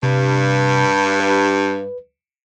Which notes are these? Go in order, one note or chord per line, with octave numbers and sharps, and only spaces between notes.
G2 C3
B4